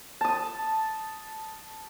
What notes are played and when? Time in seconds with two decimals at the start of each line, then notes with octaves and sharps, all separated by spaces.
0.21 A5 D#6